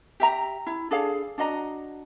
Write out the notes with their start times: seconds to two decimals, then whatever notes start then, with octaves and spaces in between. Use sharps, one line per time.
0.20 G4 E5 A#5
0.67 E4
0.91 D4 G#4 A4 F5
1.38 D4 F#4 D#5 A#5